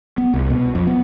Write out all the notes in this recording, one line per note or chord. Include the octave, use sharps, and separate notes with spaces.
B3
C2
B2
F2
B3